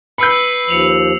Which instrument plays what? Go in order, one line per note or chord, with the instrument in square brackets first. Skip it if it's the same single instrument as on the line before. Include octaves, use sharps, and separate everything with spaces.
[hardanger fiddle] B4 [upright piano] B5 G6 [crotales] E6 C7 C#7
[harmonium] D#2 F3 [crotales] C#7 F7 F#7